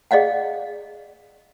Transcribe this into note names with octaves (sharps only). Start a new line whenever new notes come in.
G#4 D5 D#5 F5 F#5